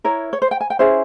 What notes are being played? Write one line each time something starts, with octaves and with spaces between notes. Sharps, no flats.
E4 A#4 C#5
C#5
C5
G5
G#5
G5
C#4 E4 G#4 C5